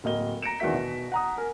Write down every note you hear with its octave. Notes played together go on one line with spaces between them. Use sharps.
D1 A#3 D#5 G7
A#5 A#6 C#7 D7 E7
E2 D#3 D4 F#4 E5 B6
B2
F#5 A#5 D#6
A#4 G#5